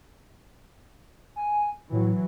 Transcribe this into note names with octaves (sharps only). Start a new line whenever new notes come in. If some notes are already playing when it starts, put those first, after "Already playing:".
G#5
A2 E3 F#3